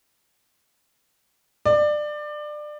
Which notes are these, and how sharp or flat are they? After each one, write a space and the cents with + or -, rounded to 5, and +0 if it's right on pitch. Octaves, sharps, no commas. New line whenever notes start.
D5 +25